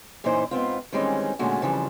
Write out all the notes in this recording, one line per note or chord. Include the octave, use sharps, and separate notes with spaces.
F#2 A#2 E3 D#4 E4 C5
G#2 B3 C4 F4
D#3 E3 G3 G#3 C4 C#4
A#2 D3 G#3 A3 C#4 F#4
F2 C#3 E3 F3 G3